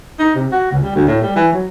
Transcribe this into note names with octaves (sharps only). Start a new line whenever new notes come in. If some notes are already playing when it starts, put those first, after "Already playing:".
D#4
C3
F#4
C#2
G3
D2
A2
G3
E3
F#3